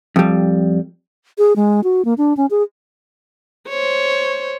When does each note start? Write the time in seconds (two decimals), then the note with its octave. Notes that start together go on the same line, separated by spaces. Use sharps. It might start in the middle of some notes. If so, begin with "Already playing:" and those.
0.16 F2 G3
1.38 G#4
1.56 G#3
1.84 F#4
2.05 A#3
2.18 D4
2.37 C#4
2.51 G#4
3.69 C5 C#5